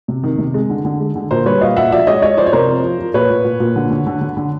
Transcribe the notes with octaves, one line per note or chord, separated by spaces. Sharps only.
C3
D#3
C3
G#3
D3
D3
G#3
D3
A#2 A#4 C5
G3 B4 C#5
A#2 D#5 F5
A#2 E5 F#5
F3 D5 E5
G#3 C#5 D#5
G#3 C#5 D#5
F3 C5 D5
C#5
C3 A#4 C5
F3
F3
F3
A#2 B4 C#5
A#2
A#2
A#2
D3
D3
D3
D3
D3